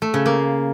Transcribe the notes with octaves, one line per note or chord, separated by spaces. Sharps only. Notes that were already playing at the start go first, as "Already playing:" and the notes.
A3
C#3
A#3